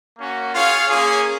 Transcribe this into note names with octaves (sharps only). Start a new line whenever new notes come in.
A#3 C#4 F#4
F4 G#4 C#5 F5
A#3 C#4 G#4